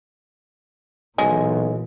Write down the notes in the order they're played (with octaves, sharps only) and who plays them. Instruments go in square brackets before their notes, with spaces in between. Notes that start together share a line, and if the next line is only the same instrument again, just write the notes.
[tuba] B1 [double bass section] A#2 E3 [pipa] G#3